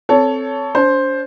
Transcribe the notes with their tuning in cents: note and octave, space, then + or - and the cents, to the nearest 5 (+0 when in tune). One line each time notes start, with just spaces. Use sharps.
C4 +0 A4 +0 C#5 +20
D4 -45 C5 +5